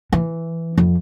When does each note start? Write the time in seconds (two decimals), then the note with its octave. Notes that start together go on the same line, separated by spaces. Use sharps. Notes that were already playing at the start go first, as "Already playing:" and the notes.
0.12 E3
0.78 F2